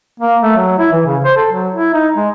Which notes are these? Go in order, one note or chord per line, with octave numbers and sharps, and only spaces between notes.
A#3
A3
F#3
E4
E3
C#3
C5
A4
F#3
E4
D#4
G#3